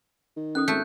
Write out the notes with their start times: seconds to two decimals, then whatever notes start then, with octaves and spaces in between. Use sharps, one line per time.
0.37 D#3
0.55 C#4 A4 D#6 F#6
0.68 G#1 A3 G6